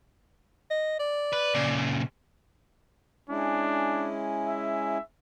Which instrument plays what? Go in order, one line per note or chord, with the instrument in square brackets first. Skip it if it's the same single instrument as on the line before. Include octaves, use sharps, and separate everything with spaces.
[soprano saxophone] D#5
D5
[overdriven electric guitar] B4
A#2 C#3
[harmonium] G#3 C#4 E4 [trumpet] D4
[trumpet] E5